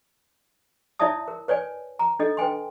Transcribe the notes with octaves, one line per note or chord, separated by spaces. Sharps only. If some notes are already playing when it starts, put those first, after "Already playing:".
E4 C#5 D5 E5 A5 D#6
A#4
B4 C#5 D5 G#5
A#5
D4 A4 D#5
B4 G5 G#5 C6